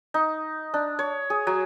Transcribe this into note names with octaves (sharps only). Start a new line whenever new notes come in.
D#4
D4
C#5
G#4
F#3